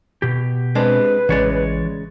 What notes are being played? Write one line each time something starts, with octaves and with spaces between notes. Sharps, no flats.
B2 G4
G#3 C4 D4 B4
A1 C#3 E3 G#3 C#5 D5